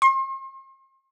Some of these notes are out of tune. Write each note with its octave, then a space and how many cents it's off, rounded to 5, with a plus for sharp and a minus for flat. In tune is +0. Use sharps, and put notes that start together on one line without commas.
C6 +40